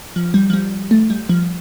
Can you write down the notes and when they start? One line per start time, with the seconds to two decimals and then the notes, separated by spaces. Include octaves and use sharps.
0.16 F3
0.34 G3
0.50 F3
0.53 G3
0.91 A3
1.10 G3
1.29 F3